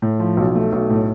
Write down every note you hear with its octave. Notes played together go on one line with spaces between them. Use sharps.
A2
F3
B1
A3
B1
A2